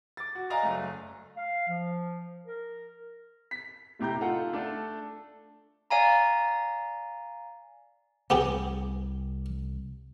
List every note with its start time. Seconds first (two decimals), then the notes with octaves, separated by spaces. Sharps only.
0.17 D6 A6
0.35 F#4
0.50 D5 D#5 F5 G#5 A#5
0.63 F#1 A3
1.37 F5
1.68 F3
2.45 A#4
3.51 B6
3.99 F1 A2 G4 A#5 G6
4.21 D#4 F4 A4 F#5
4.53 A3 D4 A4
5.90 D5 F5 G#5 A#5
8.30 C2 C3 B3 G4 G#4